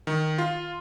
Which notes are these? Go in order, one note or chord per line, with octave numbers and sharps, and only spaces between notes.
D#3
F4